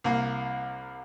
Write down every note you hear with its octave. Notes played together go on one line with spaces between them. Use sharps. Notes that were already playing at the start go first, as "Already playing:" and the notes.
C2 A#3